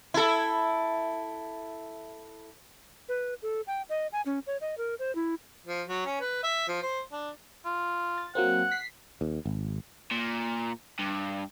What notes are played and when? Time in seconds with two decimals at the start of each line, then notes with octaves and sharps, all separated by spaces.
0.14 E4 A4
3.09 B4
3.42 A4
3.67 G5
3.89 D#5
4.12 G#5
4.26 C#4
4.47 C#5
4.61 D#5
4.78 A#4
4.99 C5
5.15 E4
5.67 F3
5.88 F#3
6.06 C#4
6.21 B4
6.43 E5
6.68 F3
6.82 C5
7.12 D4
7.65 F4
8.18 A6
8.35 F#3 A#3 C4 F#5
8.71 B6 C7
9.21 D#2
9.45 G#1
10.11 A#2
10.99 G2